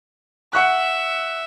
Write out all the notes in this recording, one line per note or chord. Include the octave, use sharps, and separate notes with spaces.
E5 F#5 C#6 F#6